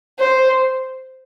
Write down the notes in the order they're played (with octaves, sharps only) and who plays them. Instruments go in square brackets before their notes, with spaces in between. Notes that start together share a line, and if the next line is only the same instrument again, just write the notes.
[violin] C5